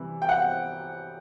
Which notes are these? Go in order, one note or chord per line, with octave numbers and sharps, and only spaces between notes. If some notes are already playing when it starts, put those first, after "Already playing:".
Already playing: C3 E3 G3
G5
F#5